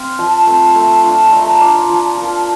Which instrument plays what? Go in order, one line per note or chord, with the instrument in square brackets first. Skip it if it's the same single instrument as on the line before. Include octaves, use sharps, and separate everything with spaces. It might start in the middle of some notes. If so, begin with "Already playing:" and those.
Already playing: [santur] C4 F5
F3 A5
A3 C4
A3
D4 F4
A3 A#5
A#5
D4 F4 D6
C6
F3
A#3 F4